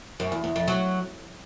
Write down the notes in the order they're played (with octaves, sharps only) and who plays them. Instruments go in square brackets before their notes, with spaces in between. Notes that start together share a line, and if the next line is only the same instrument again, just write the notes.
[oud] F#2
E2
E2
F2
F#3